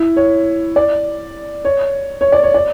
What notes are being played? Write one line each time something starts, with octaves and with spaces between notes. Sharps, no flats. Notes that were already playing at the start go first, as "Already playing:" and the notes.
Already playing: E4
C#5
D5
C#5
C#5
D5
C#5
D5